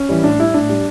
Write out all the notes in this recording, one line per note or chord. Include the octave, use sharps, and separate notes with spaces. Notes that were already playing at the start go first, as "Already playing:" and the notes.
Already playing: C#4
E3 G3
A2 D4
G3 E4
A2 D4
G3